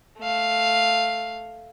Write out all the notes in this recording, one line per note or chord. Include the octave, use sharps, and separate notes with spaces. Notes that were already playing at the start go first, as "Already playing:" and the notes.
A3 F5